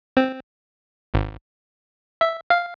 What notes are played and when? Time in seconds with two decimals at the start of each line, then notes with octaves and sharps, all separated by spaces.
0.17 C4
1.14 G#1
2.21 E5
2.50 F5